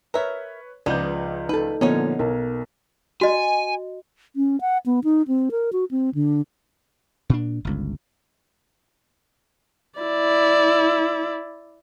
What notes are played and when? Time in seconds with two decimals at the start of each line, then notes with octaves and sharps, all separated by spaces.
0.14 A#4 B4 C#5 E5
0.86 C#2 F3 G#3 B3 D#4 D5 G6
1.49 D#4 A4 B4 A5
1.81 A#2 D3 F3 B3 C#4 D#4 C#5
2.19 B1 A#4
3.21 F#4 D#5 G#5
4.36 C#4
4.61 F#5
4.86 B3
5.04 D#4
5.28 C4
5.51 A#4
5.73 F#4
5.91 C4
6.15 D3
7.30 A#2 D4
7.65 G1 C#2
9.99 E4 D5